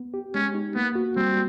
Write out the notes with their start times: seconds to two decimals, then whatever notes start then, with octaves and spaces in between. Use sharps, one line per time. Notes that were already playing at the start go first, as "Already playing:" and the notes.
Already playing: B3
0.14 G4
0.35 G#3 C#4
0.54 D#4
0.75 A#3 B3
0.95 F#4
1.16 G3 C4